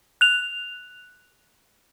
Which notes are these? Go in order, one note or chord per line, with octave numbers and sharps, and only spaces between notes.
F#6 F7